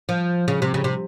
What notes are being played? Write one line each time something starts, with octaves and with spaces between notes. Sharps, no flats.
F3
C#3
C3
C#3
C3